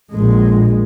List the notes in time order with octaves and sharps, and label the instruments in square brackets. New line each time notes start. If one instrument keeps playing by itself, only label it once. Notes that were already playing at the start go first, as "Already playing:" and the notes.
[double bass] A#1 G#3